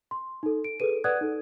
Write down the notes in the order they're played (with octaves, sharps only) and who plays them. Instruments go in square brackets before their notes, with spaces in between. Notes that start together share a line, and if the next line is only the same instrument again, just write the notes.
[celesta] C6
D#4 A4
D7
G#4 A4 B4 D#7
B4 D5 F#5 D#6 F#6 G#6
D#4 A4